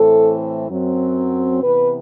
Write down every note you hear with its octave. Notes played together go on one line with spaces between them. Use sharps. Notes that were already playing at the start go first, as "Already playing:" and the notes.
Already playing: A2 E3 A3 C4 A4
F#2 F#3 C4
C3 E3 B3 B4